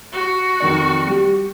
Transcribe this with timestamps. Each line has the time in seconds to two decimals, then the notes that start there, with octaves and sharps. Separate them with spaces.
0.13 F#4
0.60 F2 D#3 D5
1.07 G3 G4